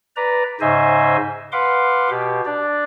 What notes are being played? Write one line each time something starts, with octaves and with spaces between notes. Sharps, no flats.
B4 D5 A#5
G#2 C#3 C5 D#5 E5 G#5
B4 F5 F#5 C6 D6
B2 G4
D4 D5